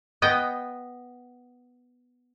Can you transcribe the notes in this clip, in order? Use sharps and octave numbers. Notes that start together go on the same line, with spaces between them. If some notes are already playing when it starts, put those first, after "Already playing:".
B3 D#5 G5